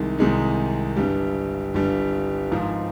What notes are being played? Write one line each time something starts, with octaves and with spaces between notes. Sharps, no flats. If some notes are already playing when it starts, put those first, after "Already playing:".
Already playing: C2 C3 D#3 G#3 D#4
C2 C3 D#3 G#3 D#4
G1 G2 G3
G1 G2 G3
G#1 G#2 F3